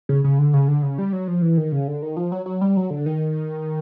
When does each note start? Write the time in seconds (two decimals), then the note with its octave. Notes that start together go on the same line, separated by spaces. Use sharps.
0.09 C#3
0.24 C#3
0.39 D3
0.53 C#3
0.68 D3
0.83 C#3
0.98 G3
1.13 F#3
1.28 F3
1.42 E3
1.58 D#3
1.72 C#3
1.88 D3
2.02 D#3
2.17 F3
2.32 F#3
2.46 F#3
2.61 G3
2.77 F#3
2.90 D3
3.06 D#3